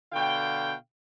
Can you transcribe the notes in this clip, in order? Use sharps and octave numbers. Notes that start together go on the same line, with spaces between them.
B2 D3 F5 G5